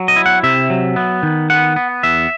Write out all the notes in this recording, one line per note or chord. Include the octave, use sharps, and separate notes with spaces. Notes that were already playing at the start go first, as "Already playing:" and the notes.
Already playing: F#3
D#5
E4
F#5
C3 E5
F#3
B3
D#3
B3 F#5
B3
E2 E5